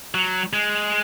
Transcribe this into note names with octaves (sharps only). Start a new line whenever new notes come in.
F#3
G#3